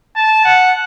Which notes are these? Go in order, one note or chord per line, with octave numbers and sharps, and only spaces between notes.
A5
F#5